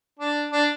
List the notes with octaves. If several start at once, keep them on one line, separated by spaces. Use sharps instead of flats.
D4
D4